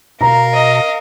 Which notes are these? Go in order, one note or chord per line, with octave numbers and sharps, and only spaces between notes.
B2 A#4 F5 A#5
D#5